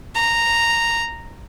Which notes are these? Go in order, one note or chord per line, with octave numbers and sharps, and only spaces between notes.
A#5